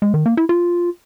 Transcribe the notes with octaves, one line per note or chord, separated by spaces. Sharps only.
G#3
D#3
A#3
E4
F4